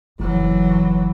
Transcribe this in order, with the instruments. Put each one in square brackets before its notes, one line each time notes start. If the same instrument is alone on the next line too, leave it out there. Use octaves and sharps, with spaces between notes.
[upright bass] F#1 [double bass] E3 F#3